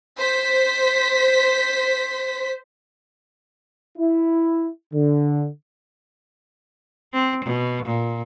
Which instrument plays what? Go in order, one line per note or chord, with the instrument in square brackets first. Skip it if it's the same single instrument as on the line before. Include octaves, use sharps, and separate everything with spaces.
[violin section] C5 B6
[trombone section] E4
D3
[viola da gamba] C4
B2
A#2